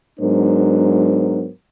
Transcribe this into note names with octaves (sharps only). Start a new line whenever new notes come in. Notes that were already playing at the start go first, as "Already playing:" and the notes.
G#2 F#3 B3 D4 A#4 C5